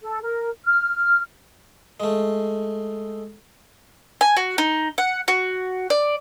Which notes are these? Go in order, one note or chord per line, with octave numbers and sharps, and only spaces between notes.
A4
A#4
F6
G#3 A3
G#5
F#4
D#4
F#5
F#4
D5